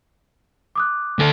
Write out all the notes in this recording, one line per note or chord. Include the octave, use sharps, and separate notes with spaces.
D6 D#6 F#6
D2 A4